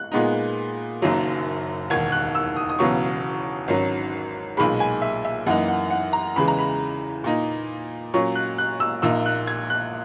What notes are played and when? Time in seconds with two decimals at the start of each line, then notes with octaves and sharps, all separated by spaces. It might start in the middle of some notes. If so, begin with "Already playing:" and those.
Already playing: F#6
0.12 A#2 G#3 B3 D#4
1.02 F#1 F#2 D#3 F#3 A#3
1.90 E1 D#2 D#3 G#6
2.12 F#6
2.35 E6
2.56 D#6
2.69 D#6
2.79 E1 E2 C#3 F#3 B3 C#6
3.68 G#1 G#2 F#3 C#4
4.57 B1 A#2 G#3 B5
4.80 G#5
5.02 E5
5.25 E5
5.46 F#2 E3 A#3 D#4 F#5
5.68 F#5
5.91 F#5
6.13 A#5
6.36 E2 C#3 E3 G#3 B5
6.48 A#5
6.59 B5
7.24 A#2 A#3 D#4
8.14 A#2 F#3 C#4 C#6
8.35 F#6
8.58 F#6
8.80 E6
9.02 A#1 A#2 A#3 D#4 E6
9.26 F#6
9.47 G#6
9.70 F#6